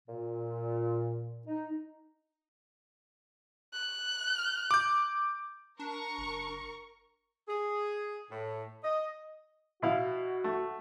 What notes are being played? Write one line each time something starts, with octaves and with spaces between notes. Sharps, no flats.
A#2
D#4
F#6
D6 G6
D4 A#4 C#6
F#1
G#4
A2
D#5
B2 E4 F#4 F5
A3